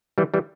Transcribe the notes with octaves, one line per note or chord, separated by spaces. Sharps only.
E3 G3
E3 G3